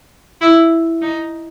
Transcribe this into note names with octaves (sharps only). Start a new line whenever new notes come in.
E4
D#4